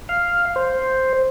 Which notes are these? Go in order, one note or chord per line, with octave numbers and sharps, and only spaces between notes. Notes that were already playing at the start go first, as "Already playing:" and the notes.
F5
C5